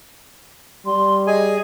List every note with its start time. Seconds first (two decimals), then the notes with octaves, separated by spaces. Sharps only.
0.86 G3 C6
1.27 G#4 D#5 G#5